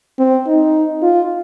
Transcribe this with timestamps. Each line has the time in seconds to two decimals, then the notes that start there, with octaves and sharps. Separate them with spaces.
0.19 C4
0.47 D#4
1.02 F4